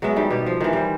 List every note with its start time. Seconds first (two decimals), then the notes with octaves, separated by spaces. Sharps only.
0.02 F#3 G#3 B3 E5
0.16 D#3 G3
0.30 B2 G4
0.46 F3
0.60 D#3 E3
0.73 G3 C5